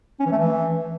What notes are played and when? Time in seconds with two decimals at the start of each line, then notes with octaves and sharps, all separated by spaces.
0.20 C#4
0.26 E3
0.32 A3
0.38 E3